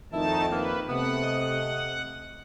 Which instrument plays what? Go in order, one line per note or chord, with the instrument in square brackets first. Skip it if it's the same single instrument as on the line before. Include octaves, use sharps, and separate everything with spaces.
[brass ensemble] F2 A#2 D#3 [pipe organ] A3 D#4 A5 [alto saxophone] E4
[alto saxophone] A#3 [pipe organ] B4
[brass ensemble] C3 A3 [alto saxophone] B3 [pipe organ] F#5
[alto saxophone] D#5